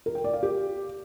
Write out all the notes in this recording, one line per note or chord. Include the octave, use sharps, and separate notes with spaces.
A#4
G5
D5
F5
G4